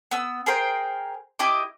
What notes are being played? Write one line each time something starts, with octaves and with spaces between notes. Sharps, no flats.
B3 E6
G#4 A#4 C5 G5
E4 G4 D#5 D6